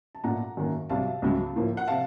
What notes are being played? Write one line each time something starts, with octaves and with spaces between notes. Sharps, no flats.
A5
A#2 A3 F#5 A#5
F#2 D#3 A#3
C2 C3 F#3 F5 A5
C#2 C#3 F#3 A3
A2 F3 A#3
F#5
C3 F5 A5